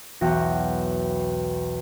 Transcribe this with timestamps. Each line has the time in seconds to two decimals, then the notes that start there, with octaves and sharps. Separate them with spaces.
0.21 B1 E2 F#4 G5 A#6